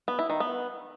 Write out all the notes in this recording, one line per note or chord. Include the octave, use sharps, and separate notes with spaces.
B3
E4
D#3
B3